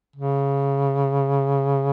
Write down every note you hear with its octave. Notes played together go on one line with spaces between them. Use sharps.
C#3